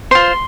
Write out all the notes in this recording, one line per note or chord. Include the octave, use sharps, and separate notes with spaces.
F4 C5 C6